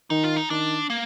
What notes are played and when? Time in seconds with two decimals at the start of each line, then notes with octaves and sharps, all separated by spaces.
0.10 D#3 D#4
0.24 F4
0.37 D#4
0.50 D#3 D4
0.90 A#3